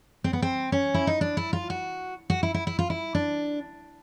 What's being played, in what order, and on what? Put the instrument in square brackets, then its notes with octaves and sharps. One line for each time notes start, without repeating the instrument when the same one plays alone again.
[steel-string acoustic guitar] C4
B3
C4
C#4
E4
D#4
D4
E4
F4
F#4
F#4
E4
E4
E4
F4
E4
D4